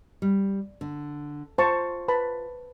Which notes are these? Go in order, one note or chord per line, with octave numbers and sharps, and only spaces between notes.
G3
D3
F4 C5 A5 C#6
B4 A5 B5